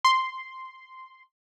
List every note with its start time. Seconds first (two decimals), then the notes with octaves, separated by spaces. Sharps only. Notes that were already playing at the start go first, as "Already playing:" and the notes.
0.05 C6